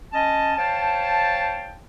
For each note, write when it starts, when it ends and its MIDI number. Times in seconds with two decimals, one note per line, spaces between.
0.13 0.53 61
0.13 0.53 75
0.13 0.53 81
0.57 1.79 72
0.57 1.79 73
0.57 1.79 77
0.57 1.79 79
0.57 1.79 81